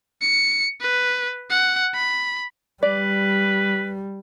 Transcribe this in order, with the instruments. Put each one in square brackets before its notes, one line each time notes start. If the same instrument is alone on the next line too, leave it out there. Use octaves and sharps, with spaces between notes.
[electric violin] C#7
B4
F#5
B5
[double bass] G3 [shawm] B4 [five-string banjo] D5